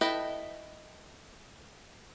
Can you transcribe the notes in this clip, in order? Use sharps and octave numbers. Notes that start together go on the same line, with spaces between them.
E4 A4 B4 D#5 G5